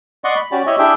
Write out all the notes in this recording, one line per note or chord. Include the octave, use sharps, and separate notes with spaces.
D5 D#5 F#5 C6 C#6
B5
C#4 F#4 G4 D5
E4 G4 C#5 D#5 E5 B5
D4 E4 G4 G#4 E5 G5